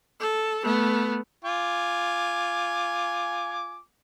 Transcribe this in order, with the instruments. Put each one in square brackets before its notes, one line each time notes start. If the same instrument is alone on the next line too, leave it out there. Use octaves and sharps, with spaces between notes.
[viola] A4
A3 B3
[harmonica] F4 G#5 D6